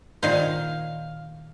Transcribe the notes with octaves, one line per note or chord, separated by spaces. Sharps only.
A#2 D#3 C5 F5